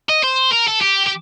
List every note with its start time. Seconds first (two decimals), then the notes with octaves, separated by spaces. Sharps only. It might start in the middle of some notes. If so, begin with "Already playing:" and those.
0.09 D#5
0.23 C5
0.52 A#4
0.67 A4
0.81 G4
1.06 G4